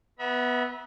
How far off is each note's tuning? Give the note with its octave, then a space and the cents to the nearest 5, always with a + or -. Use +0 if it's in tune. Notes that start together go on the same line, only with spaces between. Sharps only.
B3 +0 E5 -20 B5 -45